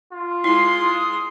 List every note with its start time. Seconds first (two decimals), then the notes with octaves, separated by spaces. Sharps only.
0.13 F4
0.44 G#3 E4 C6 C7
0.81 D#6